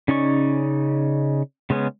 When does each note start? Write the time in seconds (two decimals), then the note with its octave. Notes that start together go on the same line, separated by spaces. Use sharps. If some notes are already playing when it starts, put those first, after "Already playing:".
0.08 C#3 C#4 D#4 D5 C#6
1.70 C#3 G#3 B3 C#4